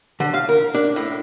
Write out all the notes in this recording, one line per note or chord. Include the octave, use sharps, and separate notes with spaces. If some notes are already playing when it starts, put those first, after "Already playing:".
D3
F5
A#4
D4
A2